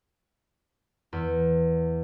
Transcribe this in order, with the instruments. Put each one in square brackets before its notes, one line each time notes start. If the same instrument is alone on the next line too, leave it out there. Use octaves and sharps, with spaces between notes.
[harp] E2